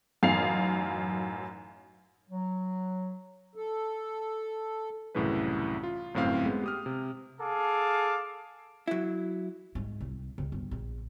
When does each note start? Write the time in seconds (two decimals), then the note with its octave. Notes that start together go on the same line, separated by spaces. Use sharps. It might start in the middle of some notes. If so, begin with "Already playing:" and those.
0.23 A1 F#2 D#4 F5 C7 F7
2.30 F#3
3.55 A4
5.15 C2 F#2 A2 C#3 E3 B4
5.83 F4
6.14 G1 F#2 A2 C4 F5
6.45 G#3 B3
6.64 G4 D#6 F6
6.86 C3
7.40 G#4 A4 F5 A5 D6
8.88 F#3 E4
9.75 G#2
10.01 C2
10.38 C#2
10.52 G1
10.71 A#1